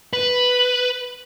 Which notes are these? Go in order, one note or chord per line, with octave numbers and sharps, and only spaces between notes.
B4